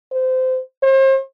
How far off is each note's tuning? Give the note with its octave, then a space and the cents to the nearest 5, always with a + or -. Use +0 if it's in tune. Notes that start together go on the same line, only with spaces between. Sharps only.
C5 -20
C5 +40